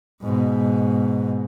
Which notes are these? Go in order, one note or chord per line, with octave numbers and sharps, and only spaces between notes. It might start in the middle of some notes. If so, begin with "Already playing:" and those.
G#2 B2